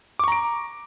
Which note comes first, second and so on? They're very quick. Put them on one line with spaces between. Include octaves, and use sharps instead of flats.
D6 C#6 A#5 D7